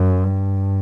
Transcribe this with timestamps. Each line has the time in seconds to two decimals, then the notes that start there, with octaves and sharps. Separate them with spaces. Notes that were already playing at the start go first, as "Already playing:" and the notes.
Already playing: F#2
0.24 G2